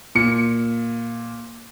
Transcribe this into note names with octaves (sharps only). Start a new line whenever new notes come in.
A#2 C#7